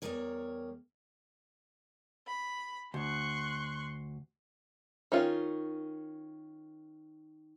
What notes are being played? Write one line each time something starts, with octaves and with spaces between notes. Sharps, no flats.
E2 F3 G3 G#4 A#4 C#5
B5
D2 C6 C#6 F#6
D#3 C#4 F4